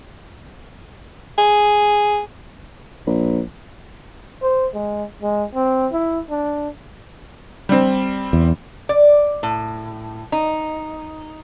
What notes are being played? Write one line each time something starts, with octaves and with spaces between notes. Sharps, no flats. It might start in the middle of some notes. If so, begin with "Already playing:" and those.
G#4
A#1
C5
G#3
G#3
C4
E4
D4
G3 C4
E2
D5
A2
D#4